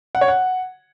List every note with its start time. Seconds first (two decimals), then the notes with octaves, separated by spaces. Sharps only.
0.15 F#5
0.21 C#5
0.28 F#5